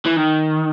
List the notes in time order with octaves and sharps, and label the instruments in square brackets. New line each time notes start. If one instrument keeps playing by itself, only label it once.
[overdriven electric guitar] E3
D#3